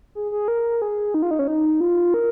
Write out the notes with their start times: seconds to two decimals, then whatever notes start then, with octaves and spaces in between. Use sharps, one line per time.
0.15 G#4
0.32 G#4
0.48 A#4
0.82 G#4
1.14 D#4
1.22 F4
1.31 D#4
1.39 C#4
1.48 D#4
1.80 F4
2.14 A#4